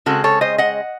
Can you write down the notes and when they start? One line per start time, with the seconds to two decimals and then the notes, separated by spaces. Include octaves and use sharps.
0.06 C#3 G#3 C4 F#4 A4
0.24 A4 C#5
0.41 C5 D#5
0.58 D#5 F#5